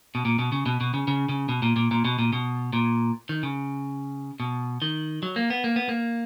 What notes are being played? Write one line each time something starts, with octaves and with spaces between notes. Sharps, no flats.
B2
A#2
B2
C#3
B2
B2
C#3
C#3
C#3
B2
A#2
A#2
A#2
B2
A#2
B2
A#2
D#3
C#3
B2
D#3
F#3
A#3
B3
A#3
B3
A#3